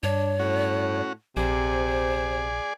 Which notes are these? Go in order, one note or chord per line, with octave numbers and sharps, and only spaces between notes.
G2 D4 C#5
A2 C#4 F#4
A#1 C3 G#4 C5 D5